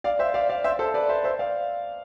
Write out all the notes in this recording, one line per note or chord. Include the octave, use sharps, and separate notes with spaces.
D5 F5
C5 E5
D5 F5
D5 F5
C5 E5
A4 C5
B4 D5
C5 E5
C5 E5
D5 F5